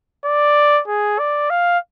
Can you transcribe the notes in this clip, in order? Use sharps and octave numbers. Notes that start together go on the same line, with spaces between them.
D5
G#4
D5
F5